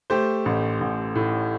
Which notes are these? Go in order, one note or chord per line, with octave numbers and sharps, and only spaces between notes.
A3 G4 C5
A1
A1
A2